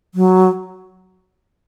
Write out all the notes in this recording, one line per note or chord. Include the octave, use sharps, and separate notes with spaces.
F#3